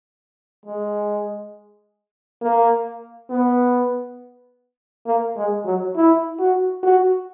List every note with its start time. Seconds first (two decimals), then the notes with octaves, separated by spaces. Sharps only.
0.65 G#3
2.42 A#3
3.30 B3
5.06 A#3
5.36 G#3
5.65 F#3
5.96 E4
6.39 F#4
6.83 F#4